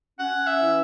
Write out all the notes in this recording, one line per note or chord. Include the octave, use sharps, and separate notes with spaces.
C#4 F#5
E5
E3